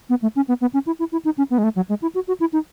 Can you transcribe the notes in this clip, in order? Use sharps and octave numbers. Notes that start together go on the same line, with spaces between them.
B3
A3
C#4
B3
B3
C#4
E4
E4
E4
D#4
C#4
B3
G#3
A3
F#3
G#3
E4
F#4
F#4
E4
D#4